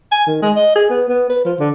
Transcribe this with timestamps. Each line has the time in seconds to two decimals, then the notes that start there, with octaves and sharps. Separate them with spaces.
0.11 G#5
0.27 D#3
0.42 G#3
0.56 D#5
0.75 G#4
0.90 B3
1.09 B3
1.29 B4
1.45 F3
1.59 D3